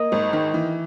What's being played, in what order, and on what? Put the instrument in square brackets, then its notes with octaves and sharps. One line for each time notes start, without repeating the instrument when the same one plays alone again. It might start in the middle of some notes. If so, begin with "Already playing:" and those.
Already playing: [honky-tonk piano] A#3 [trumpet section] D#5
[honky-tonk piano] G#1
D#3
E3